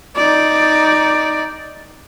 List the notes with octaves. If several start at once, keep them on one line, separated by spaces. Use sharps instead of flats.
D#4 D5